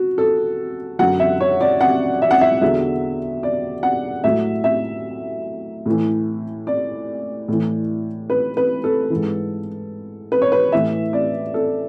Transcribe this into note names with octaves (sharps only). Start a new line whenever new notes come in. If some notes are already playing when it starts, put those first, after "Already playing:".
Already playing: F#4
A4
F#2 D3 F#3 F#5
E5
C#5
D5
F#5
E5
F#5
E5
E2 D3 F#3 E5
D5
F#5
A2 F#3 E5
E5
A2 E3
D5
A2 E3
B4
B4
A4
E3
G#2
B4
C#5
B4
A2 E3 E5
D5
A4